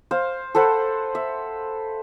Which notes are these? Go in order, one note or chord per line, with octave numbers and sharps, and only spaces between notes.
C5 F5
A4 B4 C5 F#5
E5